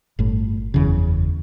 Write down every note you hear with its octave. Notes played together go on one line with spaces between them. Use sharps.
G1 A2
F#1 E2 C#3